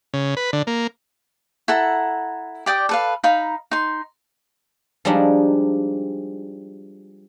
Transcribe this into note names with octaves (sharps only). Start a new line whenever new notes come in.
C#3
B4
D3
A#3
E4 A4 F#5 A#5
G4 D5 G5 D#6
A4 B4 F5
D#4 F5 A#5 B5
D#4 C6
F3 G3 G#3 D4 D#4